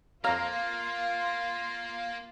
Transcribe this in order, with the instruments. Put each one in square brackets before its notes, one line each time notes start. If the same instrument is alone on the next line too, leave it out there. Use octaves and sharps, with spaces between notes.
[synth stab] F2 A#5 [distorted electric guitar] A#3 [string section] F4 [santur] F5